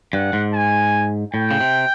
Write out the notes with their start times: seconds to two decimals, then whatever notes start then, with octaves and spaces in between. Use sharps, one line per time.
0.13 G2 F#5
0.33 G#2
0.54 G#5
1.34 A2 G5
1.51 C#3
1.61 C3